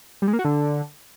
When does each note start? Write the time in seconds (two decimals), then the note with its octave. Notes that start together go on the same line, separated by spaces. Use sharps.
0.22 G3
0.28 G#3
0.33 A#3
0.39 F#4
0.45 D3